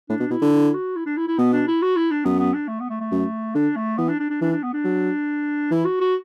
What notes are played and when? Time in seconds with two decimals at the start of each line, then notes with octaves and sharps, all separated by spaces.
0.09 A2 D4
0.20 B2
0.31 B2 E4
0.42 D3
0.53 E4
0.74 F#4
0.96 E4
1.06 D4
1.17 E4
1.27 E4
1.39 B2 B3
1.52 D4
1.67 E4
1.82 F#4
1.96 E4
2.11 D4
2.25 F#2 B3
2.39 B3
2.54 D4
2.68 A3
2.80 B3
2.90 A3
3.00 A3
3.12 F#2
3.55 D3 D4
3.76 A3
3.97 E3 B3
4.08 D4
4.19 D4
4.30 D4
4.41 E3 D4
4.52 D4
4.63 B3
4.73 D4
4.84 F#3
5.71 E3 E4
5.85 F#4
6.00 F#4